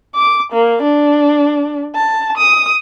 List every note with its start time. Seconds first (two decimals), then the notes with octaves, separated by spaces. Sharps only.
0.15 D6
0.52 A#3
0.82 D4
1.95 A5
2.38 D#6